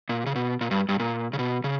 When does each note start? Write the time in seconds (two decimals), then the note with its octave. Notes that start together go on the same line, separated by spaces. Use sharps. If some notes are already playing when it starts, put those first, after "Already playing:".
0.09 A#2
0.26 C#3
0.36 B2
0.61 A#2
0.71 G2
0.89 G2
1.00 A#2
1.33 C#3
1.39 B2
1.64 C#3